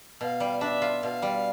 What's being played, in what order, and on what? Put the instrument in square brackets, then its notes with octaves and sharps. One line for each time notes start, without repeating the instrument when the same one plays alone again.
[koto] B2 [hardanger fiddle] F5
[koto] G3
[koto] D4 [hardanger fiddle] E5
[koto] F4
[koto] B2 [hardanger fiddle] F5
[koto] G3